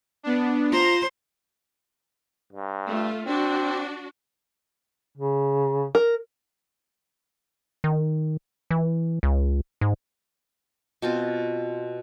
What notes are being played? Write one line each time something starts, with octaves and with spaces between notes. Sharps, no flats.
B3 D4
F4 C5 A#5
G2
A3 F4
C4 D4 F#4
C#3
A#4
D#3
E3
C#2
G#2
B2 C4 F4